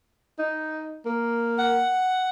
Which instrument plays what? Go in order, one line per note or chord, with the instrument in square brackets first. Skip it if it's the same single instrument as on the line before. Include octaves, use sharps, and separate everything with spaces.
[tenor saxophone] D#4
A#3
[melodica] F#5